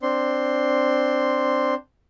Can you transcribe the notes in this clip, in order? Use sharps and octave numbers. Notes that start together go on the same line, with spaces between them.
C4 D4 C6